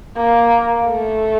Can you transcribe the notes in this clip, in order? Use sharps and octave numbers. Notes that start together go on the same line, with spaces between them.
A#3
A3